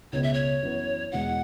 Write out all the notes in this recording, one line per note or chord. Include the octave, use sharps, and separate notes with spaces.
C#2 B2 B3 C#5
E5
C#5
F#2 E3 B3
E2 B2 G#3 F#5